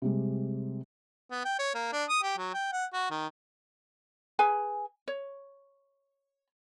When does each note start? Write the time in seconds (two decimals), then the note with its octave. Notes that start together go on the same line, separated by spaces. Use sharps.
0.02 C3 G3 G#3
1.31 B3
1.45 G5
1.59 C#5
1.74 A#3
1.93 D4
2.09 D#6
2.23 G4
2.38 F#3
2.54 G5
2.72 F#5
2.93 F#4
3.10 D#3
4.39 G#4 B4 G#5
5.08 C#5